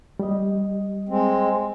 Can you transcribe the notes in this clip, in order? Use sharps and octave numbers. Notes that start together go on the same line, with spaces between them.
G3 D#5
G#3 C4